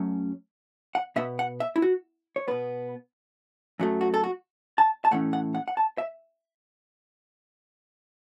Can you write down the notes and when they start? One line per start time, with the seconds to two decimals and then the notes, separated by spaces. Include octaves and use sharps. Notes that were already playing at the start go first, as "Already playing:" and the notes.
Already playing: F#2 F#3 A3 C#4
0.95 F#5
1.16 B2 B3 E5
1.39 F#5
1.60 E5
1.76 E4
1.82 F#4
2.36 C#5
2.48 B2 B3 B4
3.80 F#2 F#3 A3
4.01 F#4
4.14 A4
4.24 F#4
4.78 A5
5.05 A5
5.11 A2 E3 A3 C#4 F#5
5.33 F#5
5.55 F#5
5.68 F#5
5.77 A5
5.98 E5